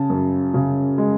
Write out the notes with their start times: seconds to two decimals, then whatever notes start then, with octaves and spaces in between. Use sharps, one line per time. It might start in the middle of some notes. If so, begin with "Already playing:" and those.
Already playing: C#3 A5
0.10 F#2
0.54 C#3
0.98 G#3